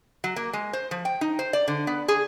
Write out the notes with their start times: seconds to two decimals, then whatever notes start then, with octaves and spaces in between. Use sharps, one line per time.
0.24 F#3
0.36 A#3
0.53 G#3
0.73 C5
0.91 F3
1.05 G5
1.21 D#4
1.39 C5
1.53 D5
1.68 D3
1.87 B3
2.08 G#4